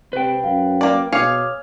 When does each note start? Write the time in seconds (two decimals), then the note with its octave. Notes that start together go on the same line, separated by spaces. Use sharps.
0.13 C3 B4 G5
0.44 F#2 F5
0.81 A#3 D5
1.12 B2 G#4 C#5 F5 D6 G#6 F7